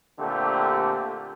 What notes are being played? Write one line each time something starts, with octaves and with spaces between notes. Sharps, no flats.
A#2 D3 A3 C4 G4